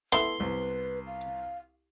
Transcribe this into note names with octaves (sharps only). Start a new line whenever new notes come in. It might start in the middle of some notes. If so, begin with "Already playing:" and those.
B3 E4 A4 E5 C6
C2 B4
F5